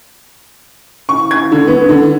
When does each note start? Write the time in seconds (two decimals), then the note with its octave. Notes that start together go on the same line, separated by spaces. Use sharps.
1.09 C#6
1.31 G#6
1.52 D3
1.67 B3
1.89 D3